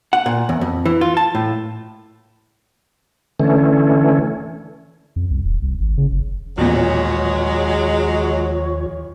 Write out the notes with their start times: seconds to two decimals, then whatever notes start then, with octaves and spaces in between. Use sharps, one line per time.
0.13 F#5
0.26 A#2
0.49 E2
0.61 F2
0.85 E3
1.01 F4
1.17 A5
1.35 A2
3.40 D3 E3 A3 C#4
5.16 F2
5.31 C2
5.44 D#1
5.62 C2
5.80 G#1
5.97 C#3
6.11 F#1
6.58 A1 D#2 A#2 F3 F#3 G#3 C#5